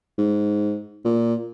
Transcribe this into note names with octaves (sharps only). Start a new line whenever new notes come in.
G#2
A#2